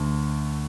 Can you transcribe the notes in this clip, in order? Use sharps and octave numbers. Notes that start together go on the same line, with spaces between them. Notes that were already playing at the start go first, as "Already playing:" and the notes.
Already playing: D2 A3